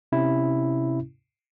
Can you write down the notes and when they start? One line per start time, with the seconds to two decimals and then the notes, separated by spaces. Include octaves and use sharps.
0.12 C3 C#4 E4